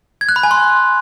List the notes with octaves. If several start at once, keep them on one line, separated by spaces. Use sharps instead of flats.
G#6
F#6
B5
G#5
C6